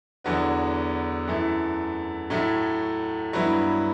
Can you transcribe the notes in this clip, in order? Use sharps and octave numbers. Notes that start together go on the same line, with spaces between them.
E2 D3 F#3 B3
F#2 E3 A3
A2 F#3 A3
G2 F#3 B3 E4